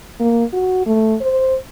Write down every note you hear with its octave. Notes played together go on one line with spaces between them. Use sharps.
A#3
F#4
A3
C5